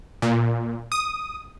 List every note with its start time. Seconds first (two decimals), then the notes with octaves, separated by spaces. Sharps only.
0.22 A#2
0.92 D#6